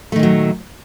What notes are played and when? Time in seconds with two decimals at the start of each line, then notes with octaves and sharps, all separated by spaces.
0.12 A3
0.16 D#3
0.19 A#2
0.23 F#3